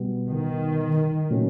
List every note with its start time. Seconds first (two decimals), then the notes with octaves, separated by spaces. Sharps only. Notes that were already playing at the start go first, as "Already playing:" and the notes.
Already playing: B2 G3 B3
0.28 D#3
1.30 A#2 F#3 A#3 C#4